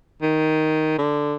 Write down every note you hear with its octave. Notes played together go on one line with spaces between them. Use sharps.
D#3
D3